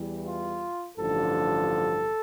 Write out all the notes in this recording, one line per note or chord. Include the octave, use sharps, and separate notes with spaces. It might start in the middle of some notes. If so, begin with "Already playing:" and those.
Already playing: E2 E3 G3
F4
A1 G2 D3 F3 A4